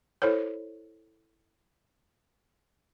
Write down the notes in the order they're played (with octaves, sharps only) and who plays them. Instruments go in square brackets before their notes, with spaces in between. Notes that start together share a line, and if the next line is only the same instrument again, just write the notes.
[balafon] E4 A4 C5 C#5